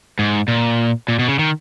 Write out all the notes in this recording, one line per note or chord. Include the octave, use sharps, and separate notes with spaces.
G#2
A#2
A#2
B2
C#3
D#3